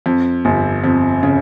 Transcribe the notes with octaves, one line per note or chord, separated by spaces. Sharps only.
F2
G1
F2
C#3